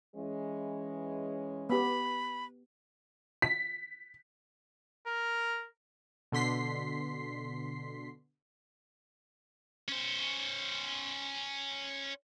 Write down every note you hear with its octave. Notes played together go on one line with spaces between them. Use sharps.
E3 G#3 C#4
B3 G4 B5
B6
A#4
B2 D3 C6 B6 C7
C#4 C5